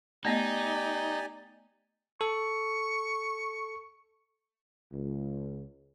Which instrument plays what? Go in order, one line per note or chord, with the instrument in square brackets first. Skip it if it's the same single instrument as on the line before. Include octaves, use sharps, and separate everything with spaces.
[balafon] A3 B3 D#5 [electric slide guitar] D#4 [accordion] G4 D5 G#5
[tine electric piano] A4 [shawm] C#6
[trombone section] C#2